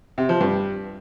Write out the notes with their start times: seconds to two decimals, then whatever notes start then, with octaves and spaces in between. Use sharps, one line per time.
0.18 C3
0.29 F3
0.41 G2